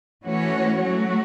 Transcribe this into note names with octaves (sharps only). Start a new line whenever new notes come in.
E3 A3 C#4 F#4 C#5
F#3 A3 F#4